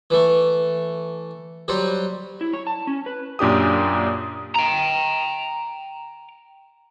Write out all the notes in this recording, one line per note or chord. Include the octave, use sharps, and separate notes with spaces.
E3 A3
F#3 G3 C5
E4
C#5
A5
C#4
B4
F#2 A#2 D4 G4 D#6
G5 A#5